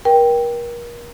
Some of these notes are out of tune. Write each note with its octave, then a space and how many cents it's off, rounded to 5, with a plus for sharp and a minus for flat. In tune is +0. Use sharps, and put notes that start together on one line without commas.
A#4 +35 G5 +0